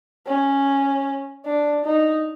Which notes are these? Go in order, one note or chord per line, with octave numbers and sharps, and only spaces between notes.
C#4
D4
D#4